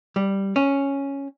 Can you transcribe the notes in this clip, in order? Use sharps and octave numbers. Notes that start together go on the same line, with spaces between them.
G3
C#4